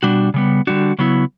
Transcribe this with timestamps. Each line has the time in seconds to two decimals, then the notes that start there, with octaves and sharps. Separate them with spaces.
0.03 B2 G3 D4 F#4
0.34 C#3 G3 B3
0.67 D3 G3 D4 F#4
0.99 C#3 F#3 B3 E4